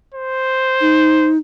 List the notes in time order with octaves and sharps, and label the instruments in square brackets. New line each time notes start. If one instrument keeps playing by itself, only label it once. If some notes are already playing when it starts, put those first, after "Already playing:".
[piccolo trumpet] C5
[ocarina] D#4